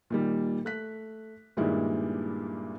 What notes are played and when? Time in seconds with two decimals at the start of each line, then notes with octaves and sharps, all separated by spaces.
0.10 A#2 D#3 G3
0.65 A3 F#6 B6
1.57 G2 A#2 D#3 G3 G#3 E4